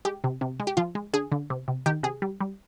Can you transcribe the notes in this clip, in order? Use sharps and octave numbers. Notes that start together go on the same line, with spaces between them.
G#3 G4
C3
C3
G#3
G4
F3 F4
G#3
D3 G#4
D3
C3
C3
D#3 G4
C3 G#4
G3
G3